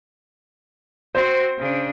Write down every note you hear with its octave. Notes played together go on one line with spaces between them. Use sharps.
C4 F#4 C5
C#3 D4